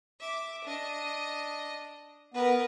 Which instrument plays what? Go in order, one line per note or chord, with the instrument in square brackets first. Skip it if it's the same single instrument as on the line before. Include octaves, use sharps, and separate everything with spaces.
[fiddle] E5 D6
D4 D#5
[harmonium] B3 [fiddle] A#4 B4